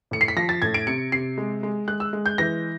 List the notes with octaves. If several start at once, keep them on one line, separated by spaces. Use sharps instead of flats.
A2 C#7
C7
B6
F3 A#6
A6
A2 G#6
D7
C3 C#7
C3 C7
G#3
G#3
G#3 F#6
E6
G#3
G6
E3 A#6